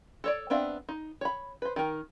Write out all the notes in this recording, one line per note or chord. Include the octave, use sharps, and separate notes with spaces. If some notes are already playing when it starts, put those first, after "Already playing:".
A4 C#5 D5
B3 C4 D4 E5 F5
D#4
C#5 B5
B4 C5
D#3 A#4